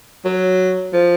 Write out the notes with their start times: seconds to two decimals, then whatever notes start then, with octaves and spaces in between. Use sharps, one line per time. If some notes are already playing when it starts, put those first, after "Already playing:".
0.25 F#3
0.93 F3